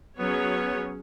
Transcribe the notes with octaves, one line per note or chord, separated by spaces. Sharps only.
F#3 B3 C#4 G#4 C#5